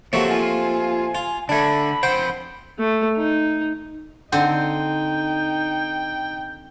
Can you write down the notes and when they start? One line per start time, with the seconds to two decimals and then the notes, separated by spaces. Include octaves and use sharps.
0.13 F3 A3 A#3 C4 G4 C#5 F#5 C#6
0.30 F4 G#5
1.15 F4
1.49 D3 A3 D4 A5 B5 G#6
2.03 F2 C5 F#5 G5
2.79 A3
3.17 D#4
4.32 D3 C4 D#4 G5